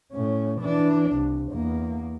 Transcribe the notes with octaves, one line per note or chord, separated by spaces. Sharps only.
A2 C#4
E3 D4
C2
E2 A#3